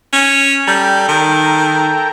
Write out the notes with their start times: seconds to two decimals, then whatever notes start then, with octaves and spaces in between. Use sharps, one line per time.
0.13 C#4
0.67 G3 A4 G5 A#5
1.08 D#3